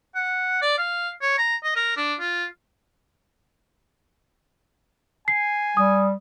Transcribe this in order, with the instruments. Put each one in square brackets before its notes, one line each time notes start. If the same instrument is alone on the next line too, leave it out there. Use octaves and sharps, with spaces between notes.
[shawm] F#5
D5
F5
C#5
A#5
D#5
A#4
D4
F4
[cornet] G#5 [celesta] C7
[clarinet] G3 [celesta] D#6